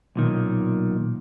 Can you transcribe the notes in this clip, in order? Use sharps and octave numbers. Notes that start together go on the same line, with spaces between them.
B1 A#2 D#3